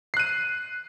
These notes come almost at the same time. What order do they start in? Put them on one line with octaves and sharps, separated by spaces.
C7 F#6 D#7